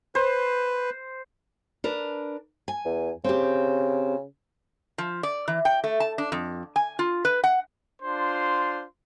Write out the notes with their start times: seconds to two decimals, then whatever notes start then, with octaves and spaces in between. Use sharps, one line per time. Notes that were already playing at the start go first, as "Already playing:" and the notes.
0.15 B4 C5
1.84 D4 A#4 B4
2.68 G#5
2.85 E2
3.24 C#3 C4 G4
4.98 F3
5.23 D5
5.48 E3
5.65 G5
5.84 A3
6.00 A5
6.18 D4
6.32 F2
6.76 G#5
6.99 F4
7.25 B4
7.44 F#5
8.02 D4 F4 C5 C6